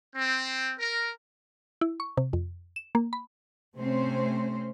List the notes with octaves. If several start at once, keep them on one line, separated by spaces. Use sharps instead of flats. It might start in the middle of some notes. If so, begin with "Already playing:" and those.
C4
A#4
E4
C#6
C3
F2
E7
A#3
B5
C3 A3 C4 C#4 C5